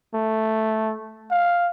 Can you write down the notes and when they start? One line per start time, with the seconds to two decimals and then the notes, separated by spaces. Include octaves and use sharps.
0.14 A3
1.31 F5